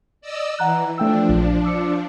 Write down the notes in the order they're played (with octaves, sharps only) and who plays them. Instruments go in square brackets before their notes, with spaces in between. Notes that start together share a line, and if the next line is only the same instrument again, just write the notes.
[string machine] D5 D#5 E6
[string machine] E3 [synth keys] F#5 A#5 F#6
[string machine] F3 D4 [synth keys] A3 G5 E6
[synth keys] A#1
D6 E6 C#7